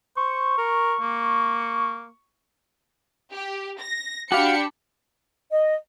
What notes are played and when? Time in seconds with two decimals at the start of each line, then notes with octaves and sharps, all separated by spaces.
0.17 C5 C#6
0.58 A#4
1.01 A#3
3.33 G4
3.79 A#6
4.32 D4 F#4 G4 F5 B5 C#7
5.52 D#5